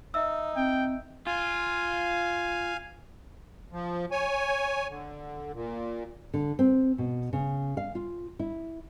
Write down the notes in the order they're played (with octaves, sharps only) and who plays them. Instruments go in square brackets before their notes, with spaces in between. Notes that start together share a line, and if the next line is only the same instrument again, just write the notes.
[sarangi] D#4 [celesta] E5 E6
[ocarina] C4 [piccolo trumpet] G5
[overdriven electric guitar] F4 [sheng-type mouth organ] F5 G#5
[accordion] F3
C#5 G#5
D3
A#2
[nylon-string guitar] D3
C4
B2
C#3
F5
F4
E4